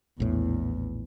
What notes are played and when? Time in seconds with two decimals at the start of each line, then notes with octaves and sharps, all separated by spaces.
0.20 A#1 E2 A2